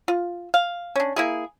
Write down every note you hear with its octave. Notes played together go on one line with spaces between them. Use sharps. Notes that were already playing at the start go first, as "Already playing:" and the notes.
F4
F5
C#4 D4
A#3 E4 G#4